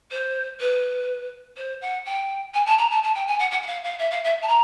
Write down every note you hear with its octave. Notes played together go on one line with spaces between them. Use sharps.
C5
B4
C5
F#5
G5
G#5
A5
A#5
A5
A5
G5
G#5
F#5
F#5
F#5
F5
F5
E5
F5
E5
A5
A#5